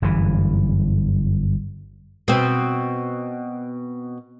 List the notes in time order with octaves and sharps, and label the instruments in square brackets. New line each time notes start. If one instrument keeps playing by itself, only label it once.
[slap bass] G1 F#2 A2 E3
[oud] B2 C4